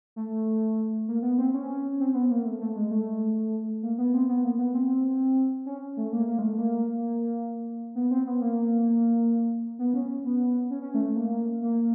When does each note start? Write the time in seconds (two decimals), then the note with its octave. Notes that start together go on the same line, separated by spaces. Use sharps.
0.16 A3
1.08 A#3
1.22 B3
1.38 C4
1.54 C#4
2.00 C4
2.14 B3
2.31 A#3
2.45 A3
2.61 A3
2.76 G#3
2.91 A3
3.83 A#3
3.98 B3
4.14 C4
4.29 B3
4.44 A#3
4.59 B3
4.74 C4
5.66 C#4
5.97 A3
6.13 A#3
6.27 A#3
6.39 G#3
6.42 A3
6.58 A#3
7.95 B3
8.11 C4
8.26 B3
8.41 A#3
9.79 B3
9.94 C#4
10.25 B3
10.70 C#4
10.82 C#4
10.94 A3
11.05 A3
11.16 A#3
11.62 A#3